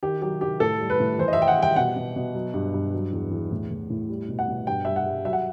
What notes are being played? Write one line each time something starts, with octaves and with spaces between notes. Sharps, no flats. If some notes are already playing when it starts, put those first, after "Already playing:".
D#3 G4
F#3 G4
D#3 G4
A2 A4
G3
B4
A2
E3 C5
D#5
E5
E3 G5
F#5
G3 G5
B2 F#5
B2
B2
F#3
G2
G2
F#3
E2
E2
A2
A2
A2
G3
B2
F#5
B2
G2 G5
G3 E5
F#5
G3
F#3 E5
F#5